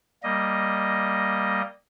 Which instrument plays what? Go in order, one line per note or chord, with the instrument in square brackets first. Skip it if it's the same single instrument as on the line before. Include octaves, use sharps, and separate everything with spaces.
[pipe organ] G3 A#3 D#5